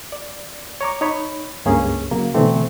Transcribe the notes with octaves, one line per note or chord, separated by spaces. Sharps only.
D5
C#5 A#5 D6
D#4 C#5 B5
C#2 G2 A#3 C#4 G#4
C#3 F#3 A#3
B2 D3 E3 A3 C4 A4